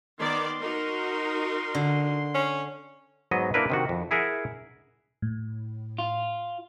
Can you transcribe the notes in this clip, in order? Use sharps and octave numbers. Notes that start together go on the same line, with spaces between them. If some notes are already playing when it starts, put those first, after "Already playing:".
D#3 B3 D5 C6
D#4 F#4 A#4
D3
C#4
G#2 F#3 B3 D#5
A#3 D4 E4 A#4 B4
C3 D#3 F#4
F2
E4 G#4 A#4 E5 F#5
A2
F4